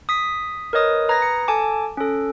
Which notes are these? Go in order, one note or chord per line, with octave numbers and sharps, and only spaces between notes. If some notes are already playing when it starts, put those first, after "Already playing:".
D#6 B6
A#4 B4 C#5 D#5 D#6
B4 A#5 D#6 G#6 A#6
C#7
A4 G#5 A5 D6
C#4 A4